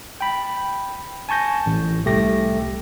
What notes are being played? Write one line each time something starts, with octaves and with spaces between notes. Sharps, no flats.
G5 B5
G#5 A5 C#6 G6 A#6
A1
C2 A3 G4 A#6